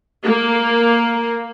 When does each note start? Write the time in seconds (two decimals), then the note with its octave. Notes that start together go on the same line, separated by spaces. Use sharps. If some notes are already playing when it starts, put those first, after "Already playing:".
0.24 A#3